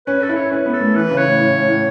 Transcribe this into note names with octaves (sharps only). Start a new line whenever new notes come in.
C#4 B4
A4
E4
C#5
C#4 B4
B3
A4
A3
E3 B4
C#3
C#5
A2
A2
A2
A2